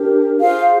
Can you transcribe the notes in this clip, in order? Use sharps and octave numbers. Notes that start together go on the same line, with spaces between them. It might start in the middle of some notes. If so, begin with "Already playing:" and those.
Already playing: D4 G4 A#4
F4 G#4 C5 F5